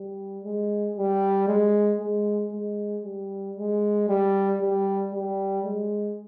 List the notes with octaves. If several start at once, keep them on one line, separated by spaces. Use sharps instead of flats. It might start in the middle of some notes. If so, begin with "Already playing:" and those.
Already playing: G3
G#3
G3
G#3
G#3
G#3
G3
G#3
G3
G3
G3
G#3